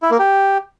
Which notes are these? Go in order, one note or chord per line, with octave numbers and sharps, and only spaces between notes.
E4
A#3
G4